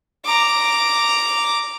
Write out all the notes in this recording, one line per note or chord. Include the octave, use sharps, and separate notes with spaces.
A#5 D6